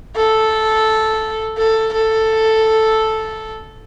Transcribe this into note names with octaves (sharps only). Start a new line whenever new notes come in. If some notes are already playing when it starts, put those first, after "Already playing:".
A4
A4
A4